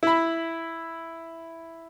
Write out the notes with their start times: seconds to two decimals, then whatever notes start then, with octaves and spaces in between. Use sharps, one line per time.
0.03 E4 B5